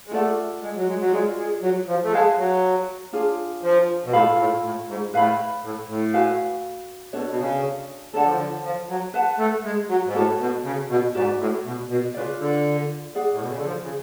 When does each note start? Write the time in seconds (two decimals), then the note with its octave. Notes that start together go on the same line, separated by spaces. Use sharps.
0.07 G#3
0.11 A3 F4 A4 D5 F#5
0.62 G#3
0.76 F#3
0.87 G#3
1.00 F#3
1.12 G#3 F4 G#4 D5
1.37 G#3
1.62 F#3
1.88 F3
2.04 A3
2.12 G#3 B4 F5 A5
2.38 F#3
3.13 D4 F4 G#4 C#5
3.63 F3
4.05 B2
4.13 A2 F4 A4 F5 B5
4.38 A2
4.63 A2
4.88 G#2
5.13 A2 B4 F5 B5
5.63 A2
5.88 A2
6.14 F#4 B4 F5 G#5
7.13 B2 D4 F#4 A4 C#5
7.28 B2
7.39 C#3
8.14 D3 A4 C#5 F#5 A5
8.26 F3
8.36 D3
8.64 F3
8.89 F#3
9.14 B4 F#5 A5
9.39 A3
9.64 G#3
9.89 F#3
10.06 G#2
10.15 A2 F#4 A4 C#5
10.39 B2
10.64 C#3
10.89 B2
11.15 G#2 F#4 B4 D5
11.40 A2
11.65 B2
11.89 B2
12.14 C#3 F4 B4 D5
12.39 D3
13.15 G#4 D5 F#5
13.33 A2
13.41 B2
13.49 C#3
13.57 D3
13.65 F3
13.81 C#3